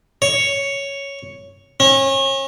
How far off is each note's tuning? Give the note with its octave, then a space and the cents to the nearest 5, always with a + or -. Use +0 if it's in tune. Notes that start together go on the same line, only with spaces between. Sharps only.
C#5 +5
C#4 -35